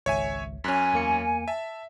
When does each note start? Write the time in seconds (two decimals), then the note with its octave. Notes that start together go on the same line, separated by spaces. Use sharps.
0.06 G#1 C#2 C#5 E5 G#5
0.64 F#2 C#4 G#5 F6 F#6 B6
0.93 E2 A#3 C#7
1.48 E5 A5